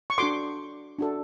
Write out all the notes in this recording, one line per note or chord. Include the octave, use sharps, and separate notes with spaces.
C#6
D4 F#4 A4 C6 D6
D4 F#4 A4